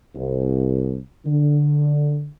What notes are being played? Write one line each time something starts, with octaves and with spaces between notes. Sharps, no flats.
C2
D3